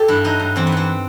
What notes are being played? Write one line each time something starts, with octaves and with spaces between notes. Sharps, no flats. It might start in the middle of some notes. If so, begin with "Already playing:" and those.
Already playing: G4 A4
G2 E4
F#3 D#4
G2
E2 C4
B3
E2 C4